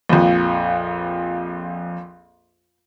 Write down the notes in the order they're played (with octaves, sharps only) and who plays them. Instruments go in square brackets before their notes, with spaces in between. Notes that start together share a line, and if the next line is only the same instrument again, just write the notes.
[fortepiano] A#1 F2